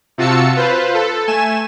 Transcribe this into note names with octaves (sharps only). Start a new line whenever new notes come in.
C3 F4 F#4 A5 E6 C#7
F4 B4 C5
A4
A3 G#5 E7